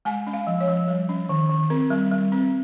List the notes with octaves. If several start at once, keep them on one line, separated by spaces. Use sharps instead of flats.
G#3 G#5
C#4
F5
F3
C#5
F3
G3
C#4
D#3
D#3
C4 A#4
G3
G3
C4